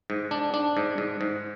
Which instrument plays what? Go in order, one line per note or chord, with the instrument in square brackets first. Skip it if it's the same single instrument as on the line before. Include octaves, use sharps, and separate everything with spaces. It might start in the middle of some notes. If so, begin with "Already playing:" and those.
[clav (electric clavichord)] G#2
D4
D4
G#2
G#2
G#2